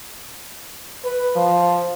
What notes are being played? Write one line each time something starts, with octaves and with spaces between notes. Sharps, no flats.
B4
F3